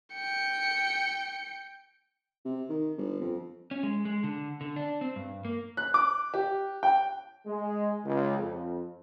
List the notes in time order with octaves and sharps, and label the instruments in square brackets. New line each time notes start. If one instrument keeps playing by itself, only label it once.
[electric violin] G5 C#7
[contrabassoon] C3
D#3
G1
F2
[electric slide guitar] C#4
G#3
G#3
D3
D3
D4
C4
G2
A#3
[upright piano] F#6
D6
G4
G5
[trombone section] G#3
C#2
F2